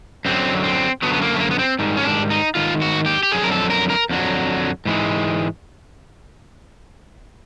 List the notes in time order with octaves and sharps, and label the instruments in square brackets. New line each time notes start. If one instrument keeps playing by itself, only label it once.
[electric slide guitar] F#2 D3 F#3 C4
C4
F#2 D3 F#3 B3
B3
A#3
A3
A#3
B3
C4
G#2 D#3 G3
C#4
D4
D#4
G#2 D#3 F4
F#4
G4
G4
F2 D3 F#3 G#4
A#4
A4
A#4
A#4
F2 D3 F#3
G#2 E3 G#3